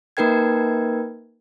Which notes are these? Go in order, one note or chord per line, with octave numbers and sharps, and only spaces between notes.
A#3 D#4 A#4 B4 G5 G#6